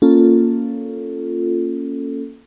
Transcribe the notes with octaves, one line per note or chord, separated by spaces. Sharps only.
A#3 C#4 F4 A4